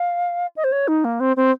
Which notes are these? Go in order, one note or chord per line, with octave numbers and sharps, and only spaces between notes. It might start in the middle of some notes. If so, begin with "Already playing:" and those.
Already playing: F5
D#5
C5
C#5
D#4
A#3
C4
C4